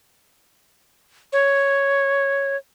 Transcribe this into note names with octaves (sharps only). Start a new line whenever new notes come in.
C#5